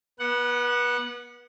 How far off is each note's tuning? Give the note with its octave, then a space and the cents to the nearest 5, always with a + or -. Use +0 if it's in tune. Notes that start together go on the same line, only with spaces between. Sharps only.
B3 -30 F#5 +0